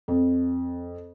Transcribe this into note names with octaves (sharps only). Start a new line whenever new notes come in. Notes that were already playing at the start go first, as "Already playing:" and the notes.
F2